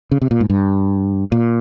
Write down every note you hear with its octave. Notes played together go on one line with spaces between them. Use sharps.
C#3
C3
A#2
G#2
G2
A#2